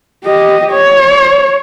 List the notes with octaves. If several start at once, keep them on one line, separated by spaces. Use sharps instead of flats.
G4 D#5
C#5